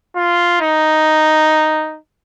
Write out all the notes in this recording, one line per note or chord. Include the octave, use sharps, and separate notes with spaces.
F4
D#4